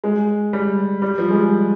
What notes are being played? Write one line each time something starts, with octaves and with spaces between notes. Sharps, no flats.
G#3
G3
G3
F3
G#3
G3